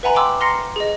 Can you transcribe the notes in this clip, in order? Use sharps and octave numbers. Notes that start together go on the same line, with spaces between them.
B4 E5 F#5 G#5 A#5 B5
G5 B5 C6 D6 E6
A#5 C6 F6 A#6 C7 C#7
G#4 D#5